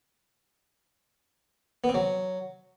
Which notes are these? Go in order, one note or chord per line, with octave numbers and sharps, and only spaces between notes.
B3
C4
F#3